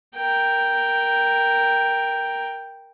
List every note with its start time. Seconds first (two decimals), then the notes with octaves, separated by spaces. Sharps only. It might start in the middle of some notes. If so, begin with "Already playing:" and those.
0.15 A#4 G5